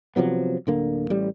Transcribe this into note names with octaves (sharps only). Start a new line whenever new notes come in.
C3 F3 F#3 B3
D1 D3 A#3
A1 G3